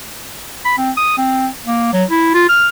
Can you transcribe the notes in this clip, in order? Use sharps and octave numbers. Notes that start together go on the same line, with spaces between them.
B5
C4
D#6
C4
A#3
F#3
E4
F4
F6